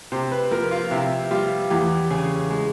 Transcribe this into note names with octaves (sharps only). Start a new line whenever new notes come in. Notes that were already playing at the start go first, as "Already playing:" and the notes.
C3 C5
B4
F3 A#4
F4
C3 E4
G3 F4
E2 G4
C#3 G#4
G#3